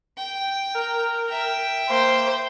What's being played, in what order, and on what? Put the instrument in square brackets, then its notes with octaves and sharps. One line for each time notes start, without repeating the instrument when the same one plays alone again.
[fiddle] G5
[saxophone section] A#4
[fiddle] E5 G5
[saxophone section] A#3 [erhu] C5